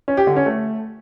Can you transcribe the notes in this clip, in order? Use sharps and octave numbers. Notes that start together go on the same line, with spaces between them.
C#4
G4
D3
C#4
A3